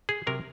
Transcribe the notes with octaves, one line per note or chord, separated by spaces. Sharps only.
G#4
C3 F#3 A#4